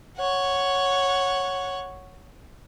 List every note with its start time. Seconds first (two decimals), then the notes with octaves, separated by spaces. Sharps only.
0.17 C#5 F#5